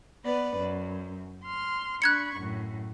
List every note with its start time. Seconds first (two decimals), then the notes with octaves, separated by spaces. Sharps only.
0.25 B3 B4 D5
0.57 F#2
1.44 C6 F6
2.02 D4 B5 C#6 F#6 G#6 C#7
2.37 F#2 A2